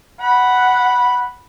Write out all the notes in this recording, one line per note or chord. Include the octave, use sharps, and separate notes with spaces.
F#5 B5